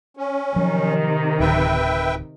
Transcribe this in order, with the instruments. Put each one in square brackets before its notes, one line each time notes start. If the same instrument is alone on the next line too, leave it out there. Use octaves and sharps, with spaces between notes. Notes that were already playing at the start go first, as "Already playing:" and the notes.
[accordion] C#4
[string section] C3 D#3 [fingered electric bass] F3 F#3
[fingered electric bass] D1 [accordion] B4 E5 G5